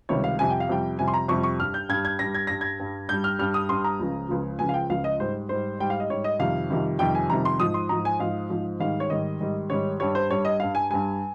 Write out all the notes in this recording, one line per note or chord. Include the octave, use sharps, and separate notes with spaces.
C#2 C3 D#3 G3 C#5
F5
F2 C3 G3 G#5
G5
F5
F2 C3 G3 G5
F2 C3 G3 G#5
C6
A#5
F2 C3 G3 C#6
C#6
G2 G3 F6
G6
G2 G3 G#6
G#6
G2 G3 A#6
G#6
G2 G3 A#6
G#6
G2 G3
G2 G3 G6
F6
G2 G3 F6
D#6
G2 G3 C6
A#5
C#2 C#3 F3
C#2 C#3 F3
C#2 C#3 F3 G#5
F5
G5
C#2 C#3 F3 F5
D#5
G#2 G3 C5
G#2 G3 C5
G#2 G3 G5
F5
D#5
G#2 G3 C#5
D#5
F2 C3 D#3 G3 F5
F2 C3 D#3 G3
F2 C3 D#3 G3 G5
G#5
F2 C3 D#3 G3 A#5
C6
G#2 F3 D#6
C6
G#2 F3 A#5
G#5
G#2 F3 F5
G#2 F3
G#2 D#3 G3 F5
C#5
G#2 D#3 G3 D#5
G#2 D#3 G3
G#2 D#3 G3 C#5
G2 G3 C#5
C5
G2 G3 C#5
D#5
G2 G3 F5
G#5
G2 G3 G#5